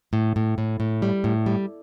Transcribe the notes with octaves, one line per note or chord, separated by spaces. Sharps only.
A2
A2
A2
A2
G3
A2
G3